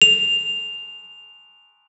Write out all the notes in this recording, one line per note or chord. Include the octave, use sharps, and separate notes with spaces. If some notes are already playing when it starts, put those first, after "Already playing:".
F7